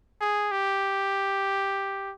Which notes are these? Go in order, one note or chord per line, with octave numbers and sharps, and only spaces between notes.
G#4
G4